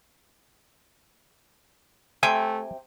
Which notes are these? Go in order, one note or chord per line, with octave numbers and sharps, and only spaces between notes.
C3 A3 C4 G5 G#5